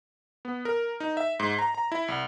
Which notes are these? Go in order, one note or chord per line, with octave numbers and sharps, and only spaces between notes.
B3
A#4
D#4
E5
G#2
A#5
A#5
E4
C2